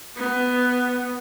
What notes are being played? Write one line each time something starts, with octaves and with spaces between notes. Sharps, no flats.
B3